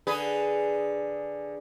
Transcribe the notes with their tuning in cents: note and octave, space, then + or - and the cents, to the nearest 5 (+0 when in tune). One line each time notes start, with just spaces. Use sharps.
D3 +0 G#4 +0 B4 +0